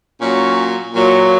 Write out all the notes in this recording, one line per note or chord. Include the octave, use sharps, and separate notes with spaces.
A#2 F#3 C#4
A#2 F#3